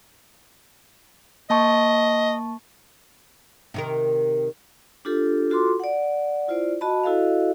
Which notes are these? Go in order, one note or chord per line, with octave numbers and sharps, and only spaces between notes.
A#3 D#5 A5 C#6
C3 D#3 A#4
D4 F4 G4 A4
F4 F#4 A4 C6 D6
D5 F#5
E4 F4 C5 D5
F#4 D#5 A5 B5
E4 F#4 A4 D#5 F5